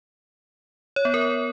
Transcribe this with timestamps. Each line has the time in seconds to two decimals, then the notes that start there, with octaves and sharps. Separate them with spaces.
0.96 C#5
1.05 B3
1.14 A#4